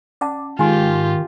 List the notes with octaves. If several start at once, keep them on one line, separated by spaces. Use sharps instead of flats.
C#4 D5 F#5 A5
G#2 D#3 F4 G4 G#5 C6